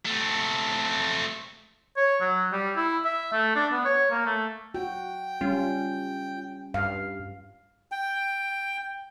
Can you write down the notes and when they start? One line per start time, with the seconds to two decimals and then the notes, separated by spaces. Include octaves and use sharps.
0.05 A3 C4
1.96 C#5
2.21 F#3
2.53 G3
2.76 E4
3.04 E5
3.33 A3
3.56 D4
3.72 B3
3.85 C#5
4.11 A#3
4.25 A3
4.74 F#4 G5
5.41 G3 C#4 F4
6.74 G2 F5
7.92 G5